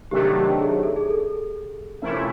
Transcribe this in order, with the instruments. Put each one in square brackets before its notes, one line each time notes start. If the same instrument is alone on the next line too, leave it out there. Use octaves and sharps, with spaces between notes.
[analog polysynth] C3 D#3 F#3 A3 D4 [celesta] G4
[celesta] G4
G#4
A4
G#4
A4
[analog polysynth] C3 F3 A3 C#4 E4 [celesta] A#4